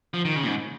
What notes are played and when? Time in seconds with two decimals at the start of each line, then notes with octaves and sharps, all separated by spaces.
0.14 F3
0.25 D#3
0.36 C#3
0.43 A#2
0.47 G#2